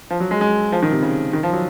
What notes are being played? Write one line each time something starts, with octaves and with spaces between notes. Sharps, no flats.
F3
F#3
G#3
G#3
F3
D#3
C3
C#3
D#3
F3
F#3